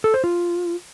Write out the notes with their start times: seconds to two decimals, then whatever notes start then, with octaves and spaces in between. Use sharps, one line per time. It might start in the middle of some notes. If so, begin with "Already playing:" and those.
0.04 A4
0.14 C5
0.24 F4